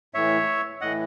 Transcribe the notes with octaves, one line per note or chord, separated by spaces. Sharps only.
A2 E3 C#5 E5
A2 E3 D#5 F#5